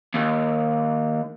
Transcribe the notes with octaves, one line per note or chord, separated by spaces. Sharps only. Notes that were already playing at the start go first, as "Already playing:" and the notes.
D#2